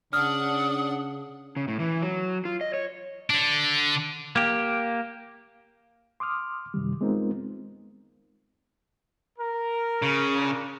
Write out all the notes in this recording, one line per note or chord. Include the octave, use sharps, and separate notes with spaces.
C#3 D4 F#5 D#6 F6
C#3
A2
E3
F#3
F4
D#5
C#5
D3 D4
A#3 G4
C6 D6 D#6 F6
F#2 C3 D#3 G3
G#3 B3 C4 D#4 F4 A#4
A#4
C#3
D4 F4 A#4